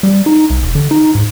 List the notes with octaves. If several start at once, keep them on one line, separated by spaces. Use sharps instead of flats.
G3
D#4
C2
E1
D3
D#4
G#2